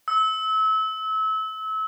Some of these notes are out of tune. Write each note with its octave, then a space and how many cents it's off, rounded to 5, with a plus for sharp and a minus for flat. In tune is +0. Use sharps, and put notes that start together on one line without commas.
E6 -30